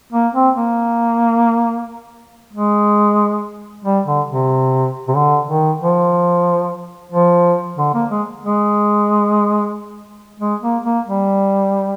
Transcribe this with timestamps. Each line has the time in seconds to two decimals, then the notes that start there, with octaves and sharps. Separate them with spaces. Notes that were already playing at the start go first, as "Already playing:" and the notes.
0.12 A#3
0.35 C4
0.56 A#3
2.53 G#3
3.85 G3
4.06 D3
4.28 C3
5.08 C3
5.15 D3
5.48 D#3
5.81 F3
7.12 F3
7.78 D3
7.94 A#3
8.11 G#3
8.43 G#3
10.40 G#3
10.62 A#3
10.84 A#3
11.06 G3